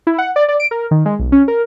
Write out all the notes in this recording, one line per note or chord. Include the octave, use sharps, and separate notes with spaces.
E4
F#5
D5
D5
D7
A#4
D#3
G#3
B1
C#4
A#4